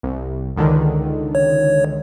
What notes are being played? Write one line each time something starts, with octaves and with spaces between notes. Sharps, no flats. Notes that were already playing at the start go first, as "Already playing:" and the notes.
C2
C#2 D3 D#3
C#5